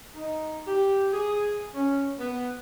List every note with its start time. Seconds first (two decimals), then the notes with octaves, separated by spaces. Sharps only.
0.15 D#4
0.67 G4
1.13 G#4
1.75 C#4
2.20 B3